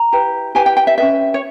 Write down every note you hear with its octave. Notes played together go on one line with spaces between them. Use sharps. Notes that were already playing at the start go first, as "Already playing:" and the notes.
Already playing: A#5
E4 G4 B4
E4 G4 B4 G#5
G5
G5
E5
C#4 G#4 B4 E5
C#5